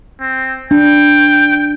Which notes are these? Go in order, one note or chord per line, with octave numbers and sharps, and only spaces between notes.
C4
D4 G5